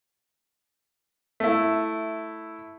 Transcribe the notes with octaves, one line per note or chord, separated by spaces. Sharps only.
A3 E4